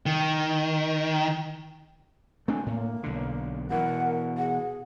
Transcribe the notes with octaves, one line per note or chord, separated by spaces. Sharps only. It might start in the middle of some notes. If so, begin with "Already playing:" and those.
D#3
A3 C4 D4 G#5
A2 A#3
B1 D3
B2 E3 A#4 F#5
G#4 F#5